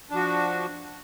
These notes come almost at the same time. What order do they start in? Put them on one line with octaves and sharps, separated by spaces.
D4 F3 F#4